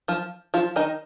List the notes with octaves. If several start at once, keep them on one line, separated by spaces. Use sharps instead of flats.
F3 F4
F3 F4
D#3 D#4